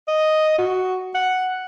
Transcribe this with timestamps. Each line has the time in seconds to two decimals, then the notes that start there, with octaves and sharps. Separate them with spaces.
0.08 D#5
0.58 F#4
1.15 F#5